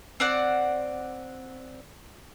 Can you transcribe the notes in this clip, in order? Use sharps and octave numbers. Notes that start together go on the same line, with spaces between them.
C4 D5 F#5